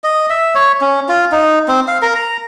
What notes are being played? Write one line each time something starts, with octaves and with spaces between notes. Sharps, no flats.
D#5
E5
C#5
C#4
F4
D#4
C4
F5
A#4
A#5